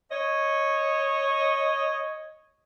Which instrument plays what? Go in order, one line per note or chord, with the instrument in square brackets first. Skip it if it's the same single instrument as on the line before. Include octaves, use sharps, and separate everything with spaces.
[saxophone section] C#5 D#5